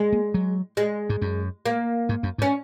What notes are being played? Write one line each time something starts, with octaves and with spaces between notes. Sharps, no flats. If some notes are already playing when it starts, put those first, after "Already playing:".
Already playing: G#3
A#3
F#3
G#3
G#2
F#2
A#3
G#2
F#2
G#2
C#4